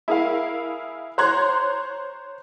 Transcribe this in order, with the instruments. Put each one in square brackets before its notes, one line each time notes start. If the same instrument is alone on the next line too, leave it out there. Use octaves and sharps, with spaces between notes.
[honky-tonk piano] E4 G#4 A#4 E5 F5
C5 C#5 A#5 C6 F#6 G#6